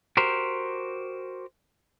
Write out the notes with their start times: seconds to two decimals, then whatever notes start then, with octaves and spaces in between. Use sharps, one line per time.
0.17 F#4 G4 A#4 C5